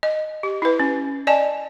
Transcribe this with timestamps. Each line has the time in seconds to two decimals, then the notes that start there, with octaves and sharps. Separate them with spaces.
0.03 D#5
0.43 G4
0.62 E4 B4
0.80 C#4
1.27 D5 D#5 G#5 A5